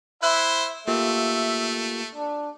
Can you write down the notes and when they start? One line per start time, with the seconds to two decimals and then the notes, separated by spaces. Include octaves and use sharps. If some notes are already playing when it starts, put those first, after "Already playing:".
0.23 E4 C5 E5 F#6
0.88 A3 A#3 F4 G4 E5
2.15 D4